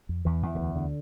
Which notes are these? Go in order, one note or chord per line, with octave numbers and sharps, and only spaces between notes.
F2
E2 E3
E2
D3
D2 E3
D2 D3